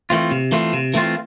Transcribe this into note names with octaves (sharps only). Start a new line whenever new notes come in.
E3 A3 C4 F4
C3
E3 A3 C4 F4
C3
E3 A3 C4 F4